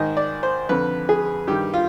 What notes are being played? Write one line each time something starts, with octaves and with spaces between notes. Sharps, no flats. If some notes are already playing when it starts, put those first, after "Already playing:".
Already playing: G#2 D#3 D#5
D5
C5
F2 D3 B4
G#4
G2 D#3 G4
F4